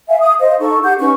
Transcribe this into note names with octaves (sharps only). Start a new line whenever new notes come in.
E5 F5 G#5
D#6
C5 D#5 F5
D#4 A4 C#6
G4 F#5 G6
C#4 D#4 B4 C#6